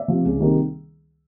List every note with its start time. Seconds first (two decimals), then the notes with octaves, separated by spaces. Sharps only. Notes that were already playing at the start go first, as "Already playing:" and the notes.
Already playing: D5 E5
0.08 C3 F3
0.25 C#2
0.40 C3 D#3 G3 A#3